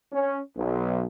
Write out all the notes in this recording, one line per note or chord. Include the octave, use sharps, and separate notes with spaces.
C#4
B1